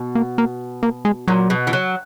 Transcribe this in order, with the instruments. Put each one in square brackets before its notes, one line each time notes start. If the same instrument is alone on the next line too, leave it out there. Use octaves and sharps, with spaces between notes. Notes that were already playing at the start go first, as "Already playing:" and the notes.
Already playing: [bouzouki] B2
[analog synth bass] A#3
A#3
A#3
G#3
[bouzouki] A#2 [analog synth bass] F#3
[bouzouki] B2
E3
F#3